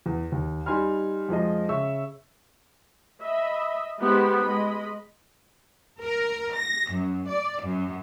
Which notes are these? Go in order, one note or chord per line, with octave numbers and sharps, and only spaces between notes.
E2
D#2
G3 D#4 G#5 B5 C6 F6
F2 F3 G#3 D#5
C#3 E5 C#6 E6
D#5 E5 B5
G#3 B3 D#4 G4 C5 B5
G#3 D#5 B5
A#4
A#6
F#2
D5
F#2